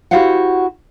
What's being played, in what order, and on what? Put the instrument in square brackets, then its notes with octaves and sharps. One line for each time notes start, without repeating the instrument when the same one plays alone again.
[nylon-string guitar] E4 F#4 G4 C5 F5 F#5